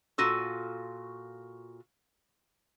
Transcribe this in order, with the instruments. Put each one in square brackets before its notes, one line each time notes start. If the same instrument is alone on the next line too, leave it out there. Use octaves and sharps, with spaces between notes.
[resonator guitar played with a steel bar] A#2 F4 F#4 A4